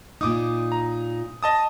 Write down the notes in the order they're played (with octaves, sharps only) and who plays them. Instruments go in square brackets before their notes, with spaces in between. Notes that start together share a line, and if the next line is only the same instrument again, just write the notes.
[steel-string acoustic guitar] A#2 D#4 [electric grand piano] D6 D#6
[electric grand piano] A#5
D#5 A5 D#6